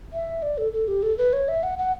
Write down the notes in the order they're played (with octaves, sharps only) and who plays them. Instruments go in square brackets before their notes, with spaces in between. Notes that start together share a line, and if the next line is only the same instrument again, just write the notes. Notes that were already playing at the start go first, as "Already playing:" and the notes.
[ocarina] E5
D5
A4
A4
G4
A4
B4
C#5
E5
F#5
F#5